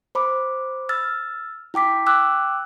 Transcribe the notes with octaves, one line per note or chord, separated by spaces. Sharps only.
C5 B5 D6
E6 F6 A6
E4 G5 D6 B6
G5 D6 E6 F#6